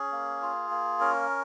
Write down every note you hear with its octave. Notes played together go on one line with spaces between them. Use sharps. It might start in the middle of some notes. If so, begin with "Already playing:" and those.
Already playing: C#4 G#4
A#3
F4
A#3
C#4 A#4